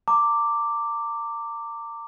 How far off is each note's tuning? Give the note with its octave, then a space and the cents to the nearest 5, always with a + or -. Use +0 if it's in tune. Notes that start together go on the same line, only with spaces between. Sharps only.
A#5 -35 D6 +0